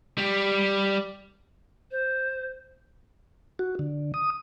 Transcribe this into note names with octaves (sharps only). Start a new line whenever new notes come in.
G3 G4
C5
F#4
D3
D#6